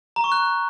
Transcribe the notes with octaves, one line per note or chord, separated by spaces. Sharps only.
A#5
C#6
F#6